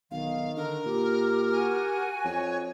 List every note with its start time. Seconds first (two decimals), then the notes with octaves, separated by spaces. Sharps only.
0.11 B1 D#3 F5
0.57 D3 A#4
0.86 A#2 G4
1.52 F#4 G#5
2.24 F2 C#5